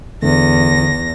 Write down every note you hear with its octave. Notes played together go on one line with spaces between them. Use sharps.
E2 D3 A#6